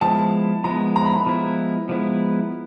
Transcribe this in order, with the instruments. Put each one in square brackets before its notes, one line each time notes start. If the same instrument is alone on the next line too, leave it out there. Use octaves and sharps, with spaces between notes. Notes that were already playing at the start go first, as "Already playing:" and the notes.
[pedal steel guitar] F3 G#3 B3 E4 [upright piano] A5
[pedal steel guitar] F3 G#3 B3 E4 [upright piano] A#5
[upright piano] A#5
B5
A#5
[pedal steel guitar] F3 G#3 B3 E4
F3 G#3 B3 E4